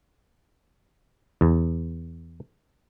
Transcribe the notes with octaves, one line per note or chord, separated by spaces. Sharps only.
E2